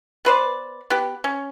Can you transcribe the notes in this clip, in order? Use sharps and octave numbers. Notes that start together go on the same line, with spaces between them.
B3 B4 C5 D5
B3 G4
C#4